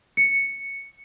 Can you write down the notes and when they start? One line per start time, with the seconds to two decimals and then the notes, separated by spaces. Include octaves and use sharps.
0.17 C#7